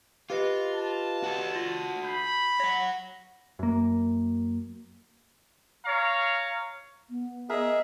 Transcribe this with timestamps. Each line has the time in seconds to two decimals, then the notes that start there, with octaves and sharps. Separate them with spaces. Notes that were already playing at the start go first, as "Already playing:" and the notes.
0.30 F4 G4 B4 D#5
0.74 A5
1.24 F#4 A4
1.56 F4
2.05 B5 G6 C7
2.60 C#5 F#5 A#6
3.59 F#2 A#3
5.86 C#5 F5 A#5
7.10 B3
7.50 G#4 A#4 D#5 E5